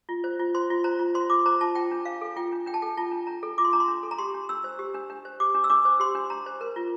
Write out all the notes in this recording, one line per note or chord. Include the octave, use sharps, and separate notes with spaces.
F4
C5
F4
C5 C6
F4
C5 A#5
F4
C5 C6
F4 D6
C5 A#5
F4 A5
F4 G5
D4
D4 F5
A4
F4 G5
D4
D4 G5
A5
A4 G5
F4 A5
D4
D4 A#5
A4
F4 D6
C6
D4 A#5
C6
D4
A4
A#5
G4 C6
D4
D4 E6
C5
G4
D4
D4
C5
G4 D6
D4
E6
D4 D6
C5
G4 C6
D4
D4 A#5
C5
A#4
F4